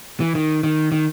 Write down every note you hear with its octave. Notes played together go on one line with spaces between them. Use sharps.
E3
D#3
D#3
D#3